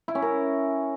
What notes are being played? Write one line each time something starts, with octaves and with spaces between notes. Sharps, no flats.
E4
C#4
A#4